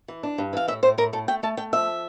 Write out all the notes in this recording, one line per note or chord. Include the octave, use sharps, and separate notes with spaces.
E3
D4
G2
E3 F5
A2 E5
A2 C5
A2 A#4
A2 A4
A3 G5
A3 A5
A3 G5
F3 E5